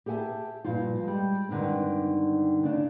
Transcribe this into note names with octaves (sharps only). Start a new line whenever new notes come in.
G4 G#4 E5 F#5 G#5 A5
G2 A#2 F3 F4
G3 G#3
G2 D3 D#3 G#3 C4
C#3 D4